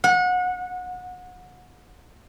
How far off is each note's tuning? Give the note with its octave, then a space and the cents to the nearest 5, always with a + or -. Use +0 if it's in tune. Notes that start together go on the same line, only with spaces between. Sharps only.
F#5 -30